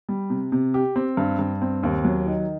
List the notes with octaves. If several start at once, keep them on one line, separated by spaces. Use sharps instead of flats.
G3
C3
C3
G4
C4
G2
G2
C4
D#2
F#3
D#3